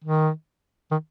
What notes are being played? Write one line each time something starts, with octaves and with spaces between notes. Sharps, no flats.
D#3
D#3